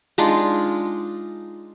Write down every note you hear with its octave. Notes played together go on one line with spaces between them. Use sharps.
G#3 D4 D#4 F4